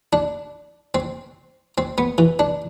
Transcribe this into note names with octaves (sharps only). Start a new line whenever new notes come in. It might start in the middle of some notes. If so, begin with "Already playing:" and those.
D4
C4
C4
B3
E3
D4